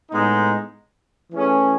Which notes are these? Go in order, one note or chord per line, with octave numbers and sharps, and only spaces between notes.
A2 G#3 B3 D#4
E3 A3 C#4 G#4